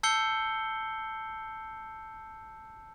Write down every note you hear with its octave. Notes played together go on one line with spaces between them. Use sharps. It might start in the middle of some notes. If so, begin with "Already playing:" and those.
A5 E6 G6 C7 C#7 G7